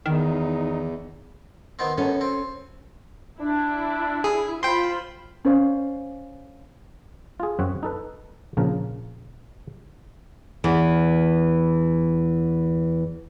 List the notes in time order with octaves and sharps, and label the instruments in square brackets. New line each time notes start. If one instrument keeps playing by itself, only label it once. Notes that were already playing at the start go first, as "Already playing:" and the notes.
[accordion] E2 [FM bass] D#3 [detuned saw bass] D#4
[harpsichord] D#3 B3 C4
[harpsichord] F#2 B3 [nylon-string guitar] C#4 A4
[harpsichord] C4
[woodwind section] D4 [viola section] E4
[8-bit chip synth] G#4
[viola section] F4 C5 B5 [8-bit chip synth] G5 C6
[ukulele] C#4 C5 D5 F5
[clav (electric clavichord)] F4 G#4
F#2 C4 C#5 F#5
D#4 A4 B4
A#1 C#3 F3 A#4
[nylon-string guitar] E2 E3